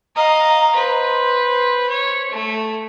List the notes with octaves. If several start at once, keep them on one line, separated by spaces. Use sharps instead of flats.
D#5 F5 A#5
B4 C5
C#5
A3